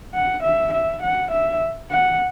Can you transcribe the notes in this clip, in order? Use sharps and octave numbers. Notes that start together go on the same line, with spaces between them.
F#5
E5
E5
F#5
E5
F#5